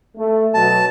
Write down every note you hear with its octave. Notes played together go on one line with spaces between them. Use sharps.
A3
B2 F#3 A5